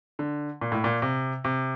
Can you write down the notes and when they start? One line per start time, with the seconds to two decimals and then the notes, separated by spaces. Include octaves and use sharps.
0.19 D3
0.61 A#2
0.72 A2
0.84 A#2
1.02 C3
1.44 C3